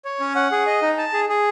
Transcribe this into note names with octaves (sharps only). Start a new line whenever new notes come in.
C#5
C#4
F#5
G#4
D#5
D#4
A5
G#4
G#4